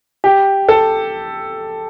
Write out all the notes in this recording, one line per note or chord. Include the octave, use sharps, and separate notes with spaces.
G4
A4